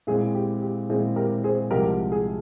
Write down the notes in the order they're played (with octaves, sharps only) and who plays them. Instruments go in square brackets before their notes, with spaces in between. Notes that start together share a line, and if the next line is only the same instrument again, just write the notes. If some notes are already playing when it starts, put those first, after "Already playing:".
[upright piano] A#2 G#3 C4 E4 [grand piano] G#4
[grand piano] G4
G4
[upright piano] A#2 G#3 C4 E4 [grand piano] G#4
[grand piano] G4 A#4
G#4 C5
[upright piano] C2 C3 F3 G#3 [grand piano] G4 A#4
[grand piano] G#4